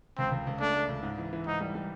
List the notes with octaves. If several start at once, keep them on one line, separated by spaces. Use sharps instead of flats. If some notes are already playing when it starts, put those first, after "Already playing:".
C#2 C4
C#2
C#2
A3 D4
A3
C#2
G#2
E3
E3
G#2 D#4
G3
G3